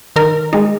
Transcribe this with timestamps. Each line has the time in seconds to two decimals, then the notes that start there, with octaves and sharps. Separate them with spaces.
0.16 D#3 A#4
0.53 G#3 D#4